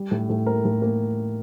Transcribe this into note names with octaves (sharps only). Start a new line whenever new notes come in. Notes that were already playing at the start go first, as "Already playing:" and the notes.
Already playing: G3
A2
A2
A#3 A#4
A2
A#3